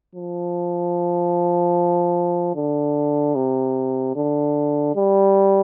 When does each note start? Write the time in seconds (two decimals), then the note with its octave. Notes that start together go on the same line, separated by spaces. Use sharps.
0.15 F3
2.56 D3
3.35 C3
4.16 D3
4.96 G3